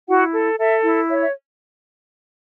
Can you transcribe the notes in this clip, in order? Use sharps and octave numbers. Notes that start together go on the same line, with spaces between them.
E4 F#4 F#5
A4
A4 E5
E4
C#5 E5
E5